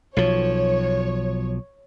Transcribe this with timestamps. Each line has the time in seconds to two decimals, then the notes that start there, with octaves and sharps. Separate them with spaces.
0.16 B1 F3 C#5